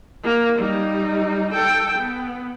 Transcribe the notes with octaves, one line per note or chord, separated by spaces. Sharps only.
A#3
G3 D#4
A4 G5
B3